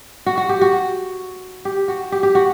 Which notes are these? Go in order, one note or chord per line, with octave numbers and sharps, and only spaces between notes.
F#4
F#4
G4
F#4
G4
F#4
G4
G4
F#4